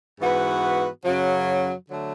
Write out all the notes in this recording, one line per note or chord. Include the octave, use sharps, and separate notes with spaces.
G#2 E3 B3 F#4 B4
F#2 C#3 F#3
D3 F#3 A3